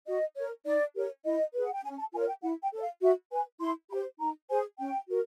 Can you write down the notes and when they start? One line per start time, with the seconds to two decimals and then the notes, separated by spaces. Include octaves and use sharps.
0.06 F#4 D#5
0.36 A#4 C#5
0.65 D#4 D5
0.94 G4 A#4 C#5
1.24 E4 D#5
1.53 G#4 B4
1.63 F#5
1.73 G5
1.83 C#4 G#5
1.98 A5
2.12 F4 A#4 C#5 G#5
2.28 G5
2.42 E4 F#5
2.62 G5
2.72 A4 C#5
2.81 F5
3.01 F#4 E5
3.31 B4 G#5
3.60 E4 C6
3.90 G4 C5 B5
4.19 D#4 A#5
4.49 G#4 C5 G#5
4.79 C#4 G5
5.08 F#4 A#4